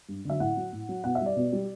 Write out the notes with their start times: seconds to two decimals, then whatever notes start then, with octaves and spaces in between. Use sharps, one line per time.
0.09 G2
0.25 D3 F#3 E5
0.40 A2 F#5
0.57 F#3
0.73 A2
0.89 F#3
1.04 B2 F#5
1.15 E5
1.21 G3 D5
1.36 B2
1.53 G3